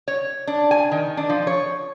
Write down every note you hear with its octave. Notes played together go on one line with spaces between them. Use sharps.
C#5
D4
G#5
D#3
D4
F3
C#5